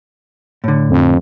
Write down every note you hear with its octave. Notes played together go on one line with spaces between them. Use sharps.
A2 D3
F2